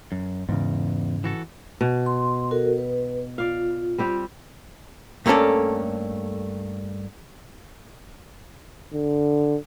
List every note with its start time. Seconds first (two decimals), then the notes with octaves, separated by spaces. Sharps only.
0.12 F#2
0.49 E2 G#2 C#3
1.24 E3 F#4 A4
1.81 B2
2.06 C6
2.51 F#4 A4 A#4
2.78 B4
3.38 F4 D5 F5
3.98 G3 C4 G4
5.26 G2 A3 A#3 C#4 A4 D5
8.94 D3